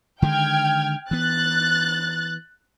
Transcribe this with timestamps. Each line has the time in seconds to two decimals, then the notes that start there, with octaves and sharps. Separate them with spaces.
0.22 D3 D#3 G#3 G5 F6 G#6
1.11 E3 B3 F#6 A6